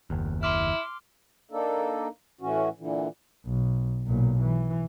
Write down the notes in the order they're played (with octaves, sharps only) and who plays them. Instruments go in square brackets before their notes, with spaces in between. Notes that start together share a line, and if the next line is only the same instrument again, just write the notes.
[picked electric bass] F#1 D#2
[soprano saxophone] E4 [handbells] C6 D6 F6
[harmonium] A#3 D4 D#4 A4
A2 E3 C#4 F#4
A#2 D3 E3
[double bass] B1
B1 A#2
E3